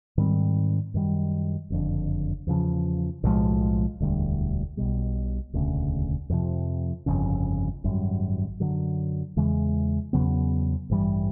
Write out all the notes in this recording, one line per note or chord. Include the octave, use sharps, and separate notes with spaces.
G#2 D#3 G3 C4
F#2 D#3 G3
F#1 F2 D3
E2 C#3 F3
B1 A2 F3 G#3
E1 D2 D3 G3
B1 B2 G3
E1 D2 C#3
F2 C3 F3
G1 F2 C#3
G#1 F#2 D#3 G3
F#2 D3 F#3
E2 C#3 E3 G#3
E2 C#3 F#3 B3
A1 G2 E3 G3